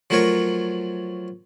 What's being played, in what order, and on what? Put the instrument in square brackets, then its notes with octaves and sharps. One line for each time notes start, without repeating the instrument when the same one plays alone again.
[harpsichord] F3 F#3 A3 A#4 C#5 C#6